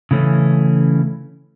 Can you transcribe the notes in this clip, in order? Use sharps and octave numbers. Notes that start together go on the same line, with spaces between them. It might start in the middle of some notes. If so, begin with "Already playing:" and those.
C#3 E3 A3 C#4